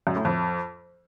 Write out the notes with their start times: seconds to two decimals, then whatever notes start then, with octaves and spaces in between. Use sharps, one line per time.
0.07 F#2
0.16 A2
0.25 F2